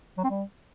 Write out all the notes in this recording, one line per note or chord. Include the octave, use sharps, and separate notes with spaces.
F#3
C4
G3